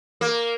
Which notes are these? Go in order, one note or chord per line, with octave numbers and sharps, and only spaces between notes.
A#3